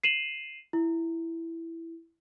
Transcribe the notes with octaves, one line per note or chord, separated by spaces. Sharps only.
C7 D#7 E7 F#7
E4